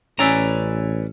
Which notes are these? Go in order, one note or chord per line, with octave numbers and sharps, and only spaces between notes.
A1 C#4 B4 D5 G#5 A#5 E6